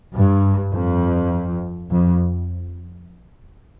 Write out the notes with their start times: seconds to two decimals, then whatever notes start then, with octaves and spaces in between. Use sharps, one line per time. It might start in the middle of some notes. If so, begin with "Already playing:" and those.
0.15 G2
0.73 F2
1.90 F2